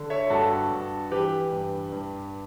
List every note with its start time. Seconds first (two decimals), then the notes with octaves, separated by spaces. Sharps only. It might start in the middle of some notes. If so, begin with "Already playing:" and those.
Already playing: D3
0.10 C#5 E5
0.30 G2 F#4 A4
0.71 G2
1.11 E3 G4 B4
1.52 G2
1.92 G2